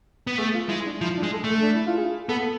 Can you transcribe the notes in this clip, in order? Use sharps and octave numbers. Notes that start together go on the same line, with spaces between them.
B3
A3 G#4
F4
G#3 E4
D4
F3 E4
D4
G#3
A4
A3
A4
D4
E4
F4
G#4
B3 A4